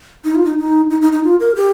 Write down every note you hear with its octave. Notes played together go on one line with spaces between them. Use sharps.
D#4
F4
D#4
D#4
D#4
D#4
D#4
F4
A#4
G4